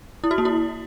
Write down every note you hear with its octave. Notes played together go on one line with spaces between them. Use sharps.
E4
F#4
A#3
E4